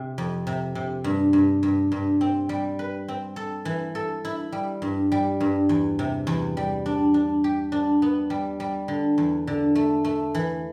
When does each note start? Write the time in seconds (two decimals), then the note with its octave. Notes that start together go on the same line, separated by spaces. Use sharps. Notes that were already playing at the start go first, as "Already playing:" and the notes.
Already playing: C3
0.18 F2
0.47 C3
0.75 C3
1.04 G2
1.33 G2
1.63 G2
1.92 G2
2.21 C4
2.49 G3
2.79 B4
3.08 C4
3.36 A4
3.65 E3
3.95 A4
4.25 E4
4.52 G3
4.82 G2
5.12 G3
5.40 G2
5.69 E2
5.99 C3
6.27 E2
6.57 G3
6.86 D4
7.14 D4
7.44 G4
7.72 D4
8.02 B3
8.30 G3
8.60 G3
8.88 D3
9.18 E2
9.47 D3
9.75 A3
10.04 A3
10.35 E3